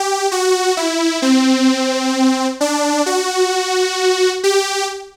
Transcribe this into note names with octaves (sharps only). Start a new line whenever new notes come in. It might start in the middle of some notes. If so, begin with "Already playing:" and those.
Already playing: G4
F#4
E4
C4
D4
F#4
G4